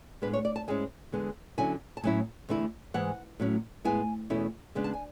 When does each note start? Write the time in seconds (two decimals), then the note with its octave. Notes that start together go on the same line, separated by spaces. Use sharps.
0.22 A2 G#3 B3 D4 B4
0.33 C#5
0.45 D5
0.56 A5
0.68 G#2 G#3 C#4 E4 G#5
1.12 E2 D3 G#3 B3
1.58 D3 F#3 C#4 E4 G#5
1.97 A5
2.03 A2 F#3 C#4 E4 G#5
2.49 E2 D3 A3 E4
2.94 G#2 E3 G#3 F#5
3.40 A2 F#3 C#4
3.85 A2 G#3 B3 E4 G#5
4.30 E2 B2 A3 C#4 E4
4.75 C#3 G#3 B3 D4
4.84 A5
4.93 G#5